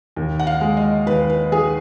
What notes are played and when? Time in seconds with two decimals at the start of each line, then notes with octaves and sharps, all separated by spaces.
0.17 D#2
0.39 F#5
0.47 F5
0.61 G#3
0.77 D#5
1.06 D#2 B4
1.30 B4
1.52 D#3 G#4